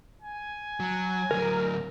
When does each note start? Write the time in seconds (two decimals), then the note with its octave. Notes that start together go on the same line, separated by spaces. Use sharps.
0.22 G#5
0.80 F#3
1.31 D2 F#3 A#4